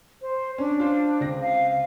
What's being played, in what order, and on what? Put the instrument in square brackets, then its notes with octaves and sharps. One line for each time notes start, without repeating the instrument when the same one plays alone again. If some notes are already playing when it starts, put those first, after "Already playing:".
[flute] C5
[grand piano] C#4 [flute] D4
[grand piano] F4 C5
C#2 C4 A#6
[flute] F5
F5